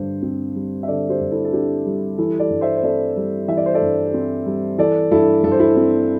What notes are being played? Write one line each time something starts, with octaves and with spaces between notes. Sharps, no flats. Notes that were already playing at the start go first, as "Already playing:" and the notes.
Already playing: G2 D3 C5
C4
G3
E5
D3 A4 D5
G4 C5
G2
E4 A4
A4
C4 D4 G4
G3
E3 E4 A4
A4 D5
G2
C5 E5
C5
C4 A4 D5
G3
E3 E5
D5
C5
A4 D5
G2
C4
G3
E3 A4 D5
G2 E4 A4
G2 A4
C5
E4 A4
C4